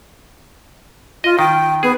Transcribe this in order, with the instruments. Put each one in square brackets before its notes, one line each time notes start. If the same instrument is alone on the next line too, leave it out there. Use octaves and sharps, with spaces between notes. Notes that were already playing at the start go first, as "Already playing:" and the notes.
[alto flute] F4 [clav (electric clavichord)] D#5
[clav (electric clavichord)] D#3 [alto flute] G5
[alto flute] B3 [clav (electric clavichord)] G#4